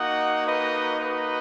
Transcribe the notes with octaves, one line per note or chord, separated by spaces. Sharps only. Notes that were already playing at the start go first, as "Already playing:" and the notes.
Already playing: A#3 D#4 F#4 D#5 F#5
B4 D#5
B4 D#5